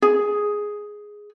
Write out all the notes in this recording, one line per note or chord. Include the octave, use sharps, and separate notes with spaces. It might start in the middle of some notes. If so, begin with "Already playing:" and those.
G#4